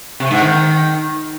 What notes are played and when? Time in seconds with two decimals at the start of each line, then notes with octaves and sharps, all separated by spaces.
0.20 C3
0.31 G#2
0.41 D#3